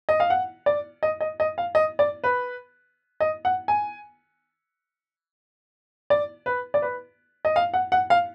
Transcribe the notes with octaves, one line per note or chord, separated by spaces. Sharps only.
D#5
F5
F#5
D5
D#5
D#5
D#5
F5
D#5
D5
B4
D#5
F#5
G#5
D5
B4
D5
B4
D#5
F5
F#5
F#5
F5